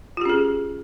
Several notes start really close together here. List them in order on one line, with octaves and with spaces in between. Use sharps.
F4 G4 C#4 G#4